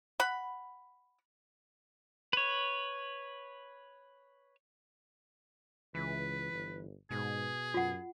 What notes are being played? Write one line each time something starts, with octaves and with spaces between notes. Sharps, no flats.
F#5 B5
B4 C#5
C#2 E3 B4
G1
G#2 B2 G#4
F#2 F4 F#5